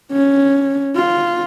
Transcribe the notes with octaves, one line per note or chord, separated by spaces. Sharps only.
C#4
F4